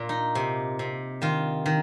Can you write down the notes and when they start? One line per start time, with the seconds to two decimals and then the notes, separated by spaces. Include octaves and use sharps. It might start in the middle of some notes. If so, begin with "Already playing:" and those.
Already playing: A#2
0.09 D#4
0.35 C3
0.79 C3
1.22 D#3 F4
1.66 D#3